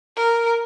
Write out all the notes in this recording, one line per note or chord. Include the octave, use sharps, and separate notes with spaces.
A#4